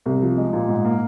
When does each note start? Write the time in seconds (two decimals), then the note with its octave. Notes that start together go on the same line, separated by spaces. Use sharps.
0.06 C2
0.22 F3
0.37 G#3
0.53 A#2
0.68 G#2
0.85 A#3